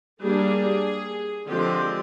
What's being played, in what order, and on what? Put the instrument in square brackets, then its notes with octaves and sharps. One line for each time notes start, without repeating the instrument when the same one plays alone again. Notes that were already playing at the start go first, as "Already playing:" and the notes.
[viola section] G3 A#3 D4 G#4
D3 F3 G#3 C4 G4